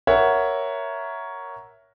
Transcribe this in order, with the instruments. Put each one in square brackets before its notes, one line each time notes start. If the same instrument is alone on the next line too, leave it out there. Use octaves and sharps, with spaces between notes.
[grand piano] A#4 C#5 E5 F#5